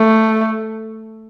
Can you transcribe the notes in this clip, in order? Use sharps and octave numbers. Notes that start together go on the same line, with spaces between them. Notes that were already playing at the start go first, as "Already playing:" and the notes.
Already playing: A3